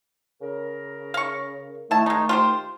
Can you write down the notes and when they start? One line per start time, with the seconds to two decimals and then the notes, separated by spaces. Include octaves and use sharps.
0.42 C#3 A#4
1.14 F5 C#6
1.91 D#3 A3 E4 A5
2.06 G#3 D#4
2.29 F4 G4 C5